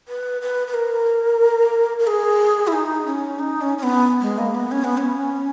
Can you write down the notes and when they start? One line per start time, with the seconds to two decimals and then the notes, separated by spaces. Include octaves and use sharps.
0.08 B4
0.41 B4
0.67 B4
0.74 A#4
1.99 A#4
2.07 G#4
2.67 E4
2.73 D#4
3.06 C#4
3.39 D#4
3.61 C#4
3.78 C#4
3.83 B3
4.22 G#3
4.38 A#3
4.55 B3
4.72 C#4
4.84 B3
4.98 C#4